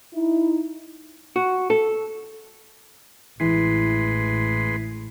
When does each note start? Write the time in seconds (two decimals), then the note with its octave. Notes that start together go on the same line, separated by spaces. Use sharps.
0.14 D#4 E4
1.36 F#4
1.70 A4
3.40 A1 E3 G#3 B4 C6